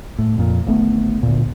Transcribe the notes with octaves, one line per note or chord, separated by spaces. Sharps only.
A2
F2 A#2
D1 G#1 A3 B3
D2 A#2